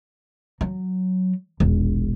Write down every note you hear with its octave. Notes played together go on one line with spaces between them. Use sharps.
F#3
E1 A#1